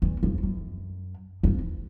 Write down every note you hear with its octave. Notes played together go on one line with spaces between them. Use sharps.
E2
F2
F#2
F2